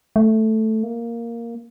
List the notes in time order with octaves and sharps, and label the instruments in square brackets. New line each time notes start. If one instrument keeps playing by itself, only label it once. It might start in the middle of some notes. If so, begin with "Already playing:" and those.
[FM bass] A3
A#3